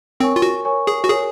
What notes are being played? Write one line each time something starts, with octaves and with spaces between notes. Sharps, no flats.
C4 A#4 C#5 G#5 C#6
F4
F#4
A#4 C#5 G#5 C#6
G#4
F#4
G#4 A#4 C#5 G#5